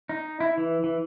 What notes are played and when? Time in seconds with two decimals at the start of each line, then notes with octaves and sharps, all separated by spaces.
0.09 D#4
0.40 E4
0.58 E3
0.84 E3